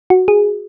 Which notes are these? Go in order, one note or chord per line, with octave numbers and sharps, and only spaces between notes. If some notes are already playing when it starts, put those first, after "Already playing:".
F#4
G#4